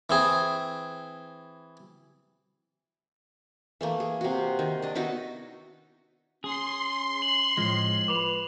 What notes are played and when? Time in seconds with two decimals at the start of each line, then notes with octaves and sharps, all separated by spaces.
0.10 E3 C4 G#4
3.81 E3 A3 A#3
4.00 G#4
4.21 C3 F#4
4.59 D#3
4.82 D4 D#5
4.95 B3 D#4 E4 F#4
6.44 C#4 G#4 C6
7.22 F#7
7.57 A2 F3 G#3
8.08 B4 D6 F7